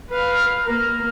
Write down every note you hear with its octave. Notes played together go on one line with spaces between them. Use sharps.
B4 F5
A#3 A#4